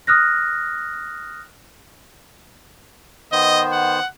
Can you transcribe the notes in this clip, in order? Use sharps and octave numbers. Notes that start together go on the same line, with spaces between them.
D#6 F6 F#6 A#6
D#3 B3 C5 D#5
F#5